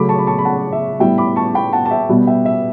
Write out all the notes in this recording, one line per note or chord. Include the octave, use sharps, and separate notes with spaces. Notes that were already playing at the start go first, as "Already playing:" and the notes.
Already playing: C#3 F#3 A3 B5 D6
A5 C#6
B5
A5 C#6
B5
F#5 A5
E5
A2 G3 B3 E5 G5
B5 D6
A5 C#6
G5 B5
F#5 A5
A5
E5 G5
B2 G3 B3
E5 G5
E5